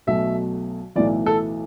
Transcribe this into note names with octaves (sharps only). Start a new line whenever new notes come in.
B1 B2 F#3 A3 E5
B1 A2 E3 D5
A4